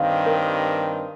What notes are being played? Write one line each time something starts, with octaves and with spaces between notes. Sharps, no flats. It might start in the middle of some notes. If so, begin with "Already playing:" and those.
Already playing: G2 D#3 G3 C4 F5
A#4